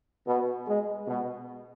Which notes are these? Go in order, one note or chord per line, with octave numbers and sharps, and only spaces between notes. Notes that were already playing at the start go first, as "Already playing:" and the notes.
B2
G#3
B2